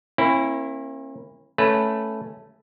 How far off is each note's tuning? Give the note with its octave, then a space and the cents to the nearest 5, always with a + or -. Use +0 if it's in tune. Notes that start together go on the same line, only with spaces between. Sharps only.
A#3 +0 C#4 -45 E4 +0
A3 +0 C#4 +0 B4 +0